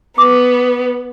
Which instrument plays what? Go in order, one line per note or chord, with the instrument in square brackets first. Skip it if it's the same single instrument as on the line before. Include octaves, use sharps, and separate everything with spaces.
[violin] B3 [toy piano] D6 D#6